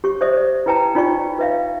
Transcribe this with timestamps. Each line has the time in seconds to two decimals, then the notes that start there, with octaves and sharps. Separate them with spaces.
0.04 G4 C#6
0.21 C5 D5 E5 D#6
0.37 D5
0.66 E4 B4 G5 A5 A#5
0.95 D#4 F4 D5 G5 C#6
1.39 B4 E5 F5